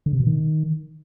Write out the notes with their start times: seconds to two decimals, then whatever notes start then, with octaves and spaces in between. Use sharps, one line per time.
0.06 D3
0.13 C3
0.20 B2
0.27 D#3